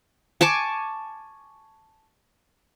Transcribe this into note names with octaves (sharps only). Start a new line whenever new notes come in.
G#5 A5 C#6 D6